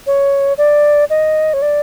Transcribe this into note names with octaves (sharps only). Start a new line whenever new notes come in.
C#5
D5
D#5
C#5
D5